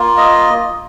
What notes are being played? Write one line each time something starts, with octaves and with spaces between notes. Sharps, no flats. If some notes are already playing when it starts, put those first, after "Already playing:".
Already playing: A#3 F4
D#5